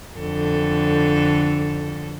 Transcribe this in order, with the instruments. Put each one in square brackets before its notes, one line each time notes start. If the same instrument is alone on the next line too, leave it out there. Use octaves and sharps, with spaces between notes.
[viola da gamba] F2 D3 A4